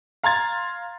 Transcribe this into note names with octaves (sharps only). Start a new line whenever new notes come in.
F5 A#5 C6 G#6 A6